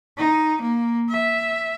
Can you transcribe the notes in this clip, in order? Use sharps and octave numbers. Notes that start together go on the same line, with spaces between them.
D#4
A#3
E5